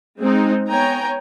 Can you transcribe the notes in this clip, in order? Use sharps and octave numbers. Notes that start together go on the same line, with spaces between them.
G#3 C4 D#4
B3 C#5 G5 G#5 A#5